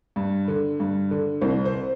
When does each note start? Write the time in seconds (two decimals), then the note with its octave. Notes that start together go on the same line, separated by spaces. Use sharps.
0.16 G2
0.48 D3
0.80 G2
1.11 D3
1.41 C2 C5
1.65 C5